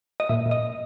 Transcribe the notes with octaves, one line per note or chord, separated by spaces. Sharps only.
D#5
A#2 E5
A#2
D#5